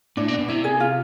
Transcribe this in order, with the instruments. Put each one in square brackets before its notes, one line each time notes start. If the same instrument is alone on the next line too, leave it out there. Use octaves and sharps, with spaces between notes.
[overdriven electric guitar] A2 [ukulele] D4
[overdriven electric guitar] B2
[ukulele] D4
[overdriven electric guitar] B2
[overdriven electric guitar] C3 [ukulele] E4
[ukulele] G#4
F4